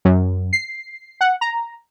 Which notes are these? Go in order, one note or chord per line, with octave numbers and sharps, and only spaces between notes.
F#2
C7
F#5
A#5